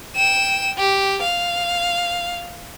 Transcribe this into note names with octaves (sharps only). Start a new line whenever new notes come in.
G5 E7
G4
F5